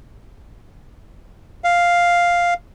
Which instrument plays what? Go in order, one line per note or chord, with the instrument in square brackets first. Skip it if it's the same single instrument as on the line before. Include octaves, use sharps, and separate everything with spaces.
[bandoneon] F5